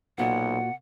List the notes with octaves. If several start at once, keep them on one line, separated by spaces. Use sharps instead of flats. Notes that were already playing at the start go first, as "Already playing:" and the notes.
B1 A#2 F#4 F#5